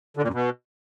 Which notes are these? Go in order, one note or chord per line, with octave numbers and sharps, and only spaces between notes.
D3
A#2
F#2
B2